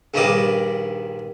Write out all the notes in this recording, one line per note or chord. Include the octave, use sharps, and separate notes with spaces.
A#1 G2 D#3 G3 D#5 D6